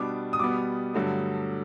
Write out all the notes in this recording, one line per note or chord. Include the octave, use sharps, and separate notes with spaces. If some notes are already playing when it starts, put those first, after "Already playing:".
Already playing: B2 G3 B3 D4 D6
D#6
B2 G3 B3 D6
G2 D3 F#3 A3